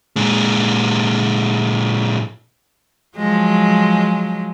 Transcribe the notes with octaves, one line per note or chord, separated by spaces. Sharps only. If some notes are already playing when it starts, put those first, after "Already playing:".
A#2 G#3
F3 F#3 G#3